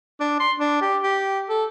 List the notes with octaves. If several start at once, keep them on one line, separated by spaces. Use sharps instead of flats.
D4
C6
D4
G4
G4
A4